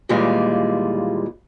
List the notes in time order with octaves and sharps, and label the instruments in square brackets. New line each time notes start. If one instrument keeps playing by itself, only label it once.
[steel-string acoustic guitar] D#2 A#2 E3 G3 G#3 F4